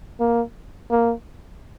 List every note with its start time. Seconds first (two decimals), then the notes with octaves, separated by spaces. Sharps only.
0.20 A#3
0.91 A#3